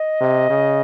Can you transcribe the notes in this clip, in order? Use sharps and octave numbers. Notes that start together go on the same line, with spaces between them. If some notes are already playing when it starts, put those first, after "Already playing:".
Already playing: D#5
C3
C#3